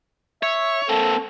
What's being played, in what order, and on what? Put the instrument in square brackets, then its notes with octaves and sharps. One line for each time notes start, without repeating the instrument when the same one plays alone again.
[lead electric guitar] C#5 [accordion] E5
[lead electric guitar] A#3 C4 [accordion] A4